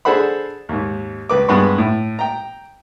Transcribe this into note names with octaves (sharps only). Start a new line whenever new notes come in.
D4 G#4 A4 C5 F#5 B5
D#2 G#2
C#2 B4 D6
G2 G#3 B3 F#5 B5 C#6
A2
G5 A#5